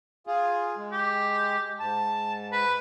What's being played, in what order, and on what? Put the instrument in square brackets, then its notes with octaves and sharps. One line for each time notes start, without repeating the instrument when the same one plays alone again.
[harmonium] F4 G#4
G#3
[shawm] G4
[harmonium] G#2 [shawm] A5
[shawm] B4